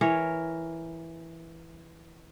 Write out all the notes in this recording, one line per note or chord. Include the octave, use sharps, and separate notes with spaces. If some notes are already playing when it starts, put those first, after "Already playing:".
E3 A#4 C#5